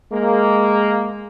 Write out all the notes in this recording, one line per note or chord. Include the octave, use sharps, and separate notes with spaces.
G#3 A#3